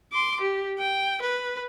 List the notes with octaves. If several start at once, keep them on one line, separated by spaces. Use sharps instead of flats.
C6 D6
G4
G5
B4